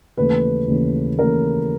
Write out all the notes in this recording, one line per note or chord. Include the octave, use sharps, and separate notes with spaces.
D#2 C#3 E3 A3 B4
D#2 C#3 E3 A3
D#2 C#3 E3 A3 A#4